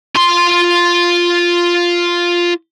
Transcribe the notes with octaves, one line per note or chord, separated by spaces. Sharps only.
F4 C6